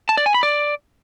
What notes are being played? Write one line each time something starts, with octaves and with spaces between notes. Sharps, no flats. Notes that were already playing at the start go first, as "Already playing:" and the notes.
A5
D5
G#5
B5
D5